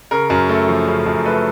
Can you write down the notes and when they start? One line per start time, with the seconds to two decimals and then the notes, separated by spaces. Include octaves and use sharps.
0.11 C#3 A#4
0.30 F#2
0.49 A3 A4
0.68 F3
0.87 C#3
1.06 F#2
1.25 A3 A4 B4